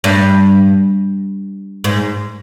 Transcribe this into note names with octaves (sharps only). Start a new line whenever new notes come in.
G2
G#2